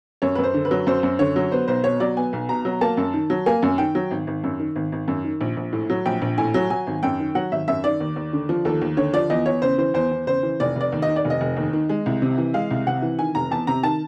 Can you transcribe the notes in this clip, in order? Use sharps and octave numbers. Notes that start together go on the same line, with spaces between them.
F#2 C#5
B4
F#2
C5
D3
B4
F#3
F#2 C5
F#2
D3 C#5
F#3
B3 C5
B1 C5
B2 C#5
F#3 D5
B3 G#5
B1
B2 A#5
F#3
A#3 A5
F#2
D#3
F#3
A#3 G#5
F#2
D#3 G5
F#3
G#1
G#1
F#2
D#3
G#1
G#1
F#2
D#3
A#1
A#1
A2
F#3
A#1 G5
A#1
A2 G#5
F#3
F#3 G#5
G#1
F#2 G5
D#3
F#3 F#5
G#1 E5
F#2 E5
D#3 D5
D#2
D#2
D3
F3
D#2 A4
D#2
D3 C#5
F3 D5
E2 D#5
E2 C#5
C#3 C5
E3 C5
E2 C5
E2
C#3 C5
E3
F1 D5
F1 D5
D#2
D#5
D#3
D5
F1
D#5
F1
D#2
D#3
G#3
C2
C3
E3
G#3 F5
C2
C3 F#5
E3
D#3 G#5
F1 A#5
E2 A5
C3 A#5
D#3 A5